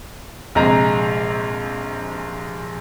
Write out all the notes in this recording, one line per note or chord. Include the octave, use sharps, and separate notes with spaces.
A#1 C3 G#3 A#5